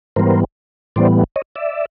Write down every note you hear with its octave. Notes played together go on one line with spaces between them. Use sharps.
G#2 E3 G3 B3 A#4 C5
A2 E3 G3 B3 C5 D5
C#5 D#5
D5 E5